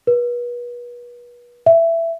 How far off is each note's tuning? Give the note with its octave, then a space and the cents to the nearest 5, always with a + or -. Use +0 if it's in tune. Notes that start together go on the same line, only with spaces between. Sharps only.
B4 -35
E5 +15